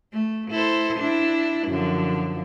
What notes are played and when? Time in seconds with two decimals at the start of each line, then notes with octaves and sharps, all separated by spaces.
0.13 A3
0.50 E4 A4 C5
0.98 D4 E4
1.68 F#2 D3 F3